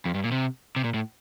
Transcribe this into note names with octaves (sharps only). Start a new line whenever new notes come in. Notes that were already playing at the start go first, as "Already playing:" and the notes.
F2
G2
A#2
C3
C3
A#2
A2